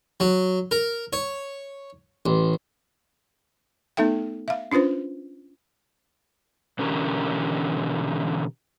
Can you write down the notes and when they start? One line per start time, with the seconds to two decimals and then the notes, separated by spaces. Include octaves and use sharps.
0.20 F#3
0.71 A#4
1.13 C#5
2.26 A1
3.97 A3 B3 D#4 A4 E5 G5
4.48 E5 F5
4.72 C#4 D4 F4 B4 C5
6.79 B2 D3 E3 C#4 G4 A#4